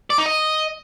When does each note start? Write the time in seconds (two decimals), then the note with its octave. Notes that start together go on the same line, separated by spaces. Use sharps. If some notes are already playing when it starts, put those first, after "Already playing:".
0.10 D5
0.18 D#4
0.26 D#5